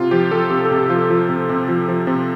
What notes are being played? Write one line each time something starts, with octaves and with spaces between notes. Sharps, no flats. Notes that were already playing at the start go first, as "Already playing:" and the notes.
Already playing: C3 F4
F3 G4
F3 A4
C3 G4
A4
C3
G4
F3 F4
F3
C3
C3
F3
F3
C3